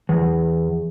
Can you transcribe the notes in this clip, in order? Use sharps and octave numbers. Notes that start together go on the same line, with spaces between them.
E2